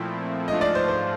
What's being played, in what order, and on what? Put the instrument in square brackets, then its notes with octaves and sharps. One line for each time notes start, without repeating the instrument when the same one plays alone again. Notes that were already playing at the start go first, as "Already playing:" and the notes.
Already playing: [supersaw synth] A#2 F3 A3 C4 E4
[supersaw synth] G#2 F3 A3 D4 F4 [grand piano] D#5
[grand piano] D5
C5
C5